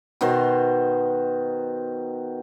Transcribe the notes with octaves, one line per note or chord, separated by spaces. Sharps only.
B2 D#3 C5 C6